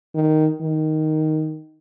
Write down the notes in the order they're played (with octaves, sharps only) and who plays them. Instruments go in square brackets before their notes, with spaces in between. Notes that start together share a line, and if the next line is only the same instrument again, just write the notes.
[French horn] D#3
D#3